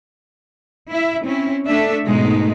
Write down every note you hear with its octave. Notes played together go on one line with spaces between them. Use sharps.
E4 E5
C4 C#4 E4
A3 D4 A4 E5
G#2 B2 G#3 A3 B3 D#4